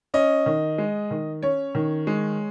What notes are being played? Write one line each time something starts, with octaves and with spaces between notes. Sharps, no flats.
C#4 D#5
D#3
G#3
D#3
C#4 C#5
D#3
G#3